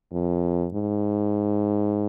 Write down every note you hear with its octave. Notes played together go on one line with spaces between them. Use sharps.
F2
G#2